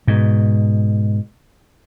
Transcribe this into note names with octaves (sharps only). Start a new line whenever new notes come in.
G#2 B2